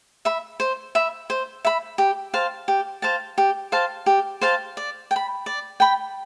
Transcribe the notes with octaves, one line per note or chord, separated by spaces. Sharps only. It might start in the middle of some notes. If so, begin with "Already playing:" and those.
E5 B5
C5
E5 B5
C5
E5 B5
G4
C5 F5 A5
G4
C5 F5 A5
G4
C5 F5 A5
G4
C5 F5 A5
D5
G5
B5
D5
G5 B5